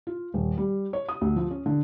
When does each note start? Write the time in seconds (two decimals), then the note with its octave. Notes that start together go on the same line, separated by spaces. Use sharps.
0.07 F4
0.34 D#1
0.58 G3
0.93 C#5
1.09 D#6
1.21 D2
1.36 F3
1.51 C#4
1.66 D3